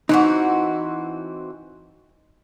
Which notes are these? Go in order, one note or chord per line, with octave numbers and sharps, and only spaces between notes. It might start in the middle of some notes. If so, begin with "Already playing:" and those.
E3 C4 D#4 F#4